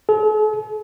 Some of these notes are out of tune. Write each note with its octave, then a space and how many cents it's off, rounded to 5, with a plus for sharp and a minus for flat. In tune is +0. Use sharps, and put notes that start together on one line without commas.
A4 -45